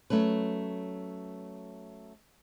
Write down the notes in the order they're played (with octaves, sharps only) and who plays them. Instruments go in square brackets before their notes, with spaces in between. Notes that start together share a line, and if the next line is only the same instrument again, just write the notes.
[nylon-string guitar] F#3 A3 C#4 B4